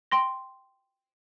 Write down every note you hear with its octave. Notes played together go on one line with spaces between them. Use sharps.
G5 C6 A#6